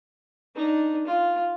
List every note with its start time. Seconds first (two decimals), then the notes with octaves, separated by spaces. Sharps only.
0.55 D4 D#4
1.06 F4